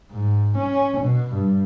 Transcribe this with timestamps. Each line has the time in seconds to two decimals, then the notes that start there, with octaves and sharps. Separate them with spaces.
0.12 G#2
0.58 C#4
1.02 B2
1.34 G2